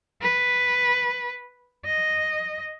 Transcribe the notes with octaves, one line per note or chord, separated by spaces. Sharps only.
B4
D#5